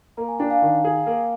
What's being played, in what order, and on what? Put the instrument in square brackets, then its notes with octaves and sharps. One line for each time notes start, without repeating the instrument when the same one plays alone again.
[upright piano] A#3 [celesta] A#5
[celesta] G#5
[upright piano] D4 [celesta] G5
[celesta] F5 G#5
[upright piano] D#3
G#4
A#3